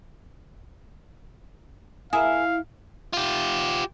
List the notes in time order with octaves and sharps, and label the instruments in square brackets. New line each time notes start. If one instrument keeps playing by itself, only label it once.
[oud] E4 E5 [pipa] G#4 A#4 [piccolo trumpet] F5
[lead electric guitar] F4 G4